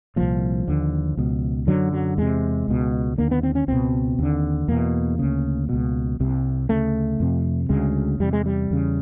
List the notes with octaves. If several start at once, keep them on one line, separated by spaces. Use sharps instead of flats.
C2 A#2 F3
D#2 D3
C#2 B2
F#2 D3 F#3
F#3
E2 C3 G#3
C#2 B2
D#2 D3 A#3
B3
C4
C#4
C#2 B2 C4
D#2 D3
E2 B2 A#3
D2 C#3
C#2 B2
C2 C3
D2 C#3 A3
F2 C3
D2 C#3 G#3
E2 C3 G3
G#3
G3
E2 C#3